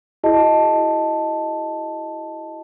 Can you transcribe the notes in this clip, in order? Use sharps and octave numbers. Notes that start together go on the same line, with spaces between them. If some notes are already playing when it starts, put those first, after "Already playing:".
E4 F#4 G#4 D#5 A5